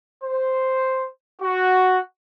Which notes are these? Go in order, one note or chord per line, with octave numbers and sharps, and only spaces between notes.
C5
F#4